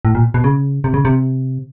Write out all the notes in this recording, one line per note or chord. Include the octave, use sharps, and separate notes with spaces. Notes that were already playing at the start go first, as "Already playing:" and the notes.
A2
A#2
B2
C#3
C3
C#3
C3